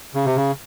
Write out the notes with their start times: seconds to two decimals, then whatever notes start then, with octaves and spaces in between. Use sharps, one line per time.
0.15 C#3
0.26 C3
0.36 C#3